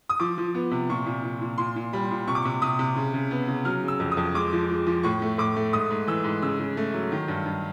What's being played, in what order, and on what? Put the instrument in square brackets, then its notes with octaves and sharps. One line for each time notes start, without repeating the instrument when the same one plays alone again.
[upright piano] D#6
F3 D6
F3
B3
C3
A#2 C#6
A#2
A#2
A#2
A#2 C6
A#2
G3 B5
A#2
C3 C#6
D6
C#6
C3
C3 D#6
C3
C#3
C#3
B3
C#3
F#3 F6
C#3 E6
F2
D#6
F2
G#3 D6
F3
G#3
F3
A2 C#6
A3
A2 D6
A3
G#2 D#6
G#2
E3 E6
G#2
C#3 E6
C#3
A3
F#3
D#3
G2
G2